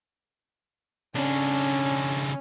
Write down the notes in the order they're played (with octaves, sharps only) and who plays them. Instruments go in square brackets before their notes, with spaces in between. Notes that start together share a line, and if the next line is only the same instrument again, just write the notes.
[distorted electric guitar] C#3 D4 [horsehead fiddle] C#4